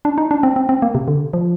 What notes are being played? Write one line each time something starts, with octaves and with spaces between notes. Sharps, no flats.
D4
D#4
D4
C4
C4
C4
A#3
C3
D3
F3